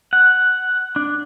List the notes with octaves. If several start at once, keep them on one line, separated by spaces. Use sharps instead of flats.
F#5
D4